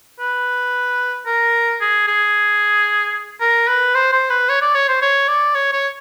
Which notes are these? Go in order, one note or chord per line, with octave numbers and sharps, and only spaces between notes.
B4
A#4
G#4
G#4
A#4
B4
C5
C5
B4
C#5
D5
C#5
C5
C#5
D5
C#5
C#5